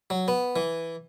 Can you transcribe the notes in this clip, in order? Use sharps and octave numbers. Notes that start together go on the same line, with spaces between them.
F#3
B3
E3